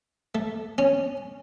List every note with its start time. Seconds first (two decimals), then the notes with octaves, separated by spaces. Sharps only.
0.35 A3
0.78 C#4